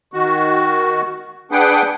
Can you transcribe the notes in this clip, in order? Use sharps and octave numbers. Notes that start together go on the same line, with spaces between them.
D#3 F#4
D4 G#4 B4 F#5 G5